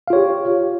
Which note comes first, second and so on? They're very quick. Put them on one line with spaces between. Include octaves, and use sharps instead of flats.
F5 F4 C#5 G4